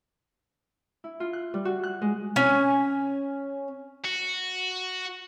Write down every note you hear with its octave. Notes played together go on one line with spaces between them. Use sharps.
E4
F4
F#6
G3
F#4
F#6
G#3
C#4 G#5
F#4